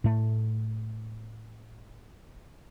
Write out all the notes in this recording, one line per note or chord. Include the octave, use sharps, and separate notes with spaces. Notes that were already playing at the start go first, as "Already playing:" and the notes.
A2 A3